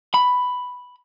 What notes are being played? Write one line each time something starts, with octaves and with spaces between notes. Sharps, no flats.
B5